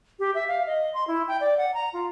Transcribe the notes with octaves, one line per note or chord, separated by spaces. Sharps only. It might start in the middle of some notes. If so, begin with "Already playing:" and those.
G4
E5
F5
D#5
C6
E4
G5
D5
F#5
A#5
F4